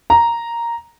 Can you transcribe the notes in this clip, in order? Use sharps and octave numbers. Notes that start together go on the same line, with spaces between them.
A#5